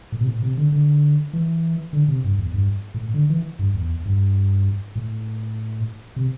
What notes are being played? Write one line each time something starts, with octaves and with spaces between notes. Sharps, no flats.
A2
C3
A2
C3
D3
D3
E3
D3
C3
G2
E2
G2
A2
D3
E3
G2
E2
G2
A2
C3